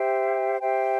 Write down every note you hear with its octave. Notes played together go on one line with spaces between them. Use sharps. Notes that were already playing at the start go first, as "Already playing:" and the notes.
Already playing: G4 C5 E5 G5
G4 C5 E5 G5